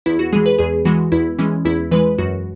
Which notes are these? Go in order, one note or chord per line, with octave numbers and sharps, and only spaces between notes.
E2 E4
F#4
E3 G#3 G#4
B4
E2 G#4
E3 G#3 F#4
E2 E4
E3 G#3 C#4
E2 E4
E3 G#3 B4
F#2 F#4